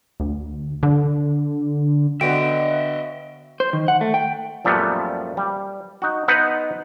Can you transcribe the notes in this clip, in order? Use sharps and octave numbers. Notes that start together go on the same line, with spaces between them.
D2
D3
D3 B3 F#4 D#5 E5 G5 D7
C5
D#3
F#5
A3
G5
F#2 A#2 F3 G3 A3 B3
G3
D#4 F#4
B3 D#4 B4 C5 F#5